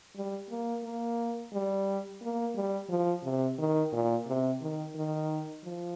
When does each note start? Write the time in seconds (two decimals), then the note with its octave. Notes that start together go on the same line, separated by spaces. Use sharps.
0.16 G3
0.50 A#3
0.85 A#3
1.53 G3
2.22 A#3
2.56 G3
2.89 F3
3.24 C3
3.58 D#3
3.93 A#2
4.27 C3
4.61 D#3
4.95 D#3
5.64 F3